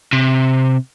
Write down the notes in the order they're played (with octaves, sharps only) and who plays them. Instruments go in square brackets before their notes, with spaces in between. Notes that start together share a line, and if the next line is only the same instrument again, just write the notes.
[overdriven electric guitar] C3